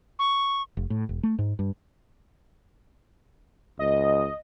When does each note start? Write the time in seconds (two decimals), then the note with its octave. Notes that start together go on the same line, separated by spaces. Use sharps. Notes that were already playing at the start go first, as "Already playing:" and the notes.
0.19 C#6
0.77 F1
0.90 A2
1.09 E1
1.23 A3
1.39 G#2
1.59 G2
3.79 C#2 D#5